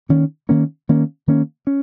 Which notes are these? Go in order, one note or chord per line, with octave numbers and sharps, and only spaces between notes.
D#3 A#3 C#4
D#3 A#3 C#4
D#3 A#3 C#4
D#3 A#3 C#4
C#4